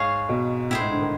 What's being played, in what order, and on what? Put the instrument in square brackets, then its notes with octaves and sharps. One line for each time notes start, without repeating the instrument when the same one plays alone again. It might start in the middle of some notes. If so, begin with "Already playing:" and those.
Already playing: [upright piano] G#2 [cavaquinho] G#4 C#5 F5
[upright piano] B2
[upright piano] A2 [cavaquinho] E4 G#4 C5
[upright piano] G#2
D3
D#3